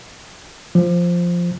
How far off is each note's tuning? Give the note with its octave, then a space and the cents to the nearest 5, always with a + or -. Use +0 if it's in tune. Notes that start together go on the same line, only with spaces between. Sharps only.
F3 +0